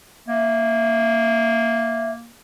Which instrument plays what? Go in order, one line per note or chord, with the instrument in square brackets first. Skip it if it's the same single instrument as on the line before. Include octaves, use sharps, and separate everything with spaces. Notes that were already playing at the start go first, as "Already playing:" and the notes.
[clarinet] A#3 [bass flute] E5